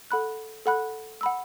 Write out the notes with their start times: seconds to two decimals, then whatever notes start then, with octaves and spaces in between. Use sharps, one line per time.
0.11 A4 F#5 B5 F#6
0.66 A4 F#5 B5 F#6
1.21 F#5 B5 E6